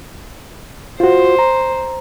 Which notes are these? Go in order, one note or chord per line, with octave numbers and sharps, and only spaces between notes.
F4 F#4 C5
A#5